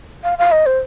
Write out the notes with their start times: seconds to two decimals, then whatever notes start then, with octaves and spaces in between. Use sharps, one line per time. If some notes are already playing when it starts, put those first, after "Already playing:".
0.24 F5
0.38 F5
0.52 D#5
0.66 C5